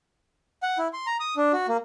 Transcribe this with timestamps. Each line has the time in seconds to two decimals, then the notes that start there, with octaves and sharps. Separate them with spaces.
0.63 F#5
0.78 E4
0.93 C6
1.06 A#5
1.20 D#6
1.37 D4
1.53 F#4
1.68 A#3